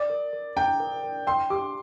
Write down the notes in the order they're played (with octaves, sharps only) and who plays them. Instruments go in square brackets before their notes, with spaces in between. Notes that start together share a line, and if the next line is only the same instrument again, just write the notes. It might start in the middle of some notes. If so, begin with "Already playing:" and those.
Already playing: [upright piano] D5
[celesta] A#4
A#4
[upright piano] G5 [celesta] A#5
[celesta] A#4
A#4
[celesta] G5 [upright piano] C6
[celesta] G4 [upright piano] D6